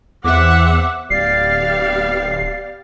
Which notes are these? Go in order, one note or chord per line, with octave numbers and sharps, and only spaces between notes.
E2 C4 E5 F#5 D6
D1 B3 G4 D5 F5 C7